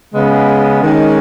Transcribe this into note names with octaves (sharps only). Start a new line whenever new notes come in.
C#3 G#3 B3
D#3 G#3 C#4